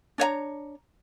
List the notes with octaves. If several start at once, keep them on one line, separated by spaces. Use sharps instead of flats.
D4 C#5 D#5 A#5